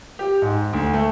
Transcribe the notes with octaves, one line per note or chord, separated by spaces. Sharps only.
G4
G#2
D2
A3